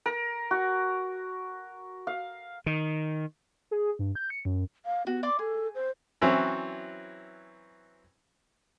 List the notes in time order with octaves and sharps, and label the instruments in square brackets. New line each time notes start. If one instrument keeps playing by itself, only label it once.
[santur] A#4
F#4
F5
[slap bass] D#3
[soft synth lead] G#4
G2
G6
C#7
F#2
[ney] F5
[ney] B3 [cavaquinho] F#4
[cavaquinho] D5 C6 D6
[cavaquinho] G#4 [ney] A4
[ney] C5
[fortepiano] E3 F#3 C4 C#4 E4